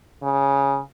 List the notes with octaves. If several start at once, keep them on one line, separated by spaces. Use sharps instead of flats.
C#3